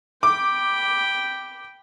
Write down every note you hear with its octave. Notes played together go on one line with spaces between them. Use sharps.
G5 B5 D6